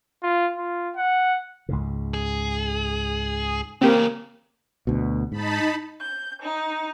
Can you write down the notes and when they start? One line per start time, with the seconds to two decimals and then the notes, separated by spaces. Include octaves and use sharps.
0.23 F4
0.57 F4
0.96 F#5
1.69 C#2 G#2 C#3
2.14 G#4
3.82 E2 C#3 A#3 C4 G4
4.87 D2 B2
5.32 G#2 D#4 A5 B5
5.99 G6
6.42 D#4